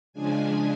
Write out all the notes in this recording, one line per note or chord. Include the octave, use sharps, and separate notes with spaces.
C#3 F3 G#3 D4 G#5